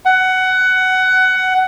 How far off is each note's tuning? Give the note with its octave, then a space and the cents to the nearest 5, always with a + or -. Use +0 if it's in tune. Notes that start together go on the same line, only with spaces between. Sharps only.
F#5 +15